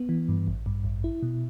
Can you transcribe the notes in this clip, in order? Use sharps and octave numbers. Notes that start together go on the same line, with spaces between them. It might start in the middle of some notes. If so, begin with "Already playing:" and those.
Already playing: B3
E3
G2
A1
G2
A1
E4
B2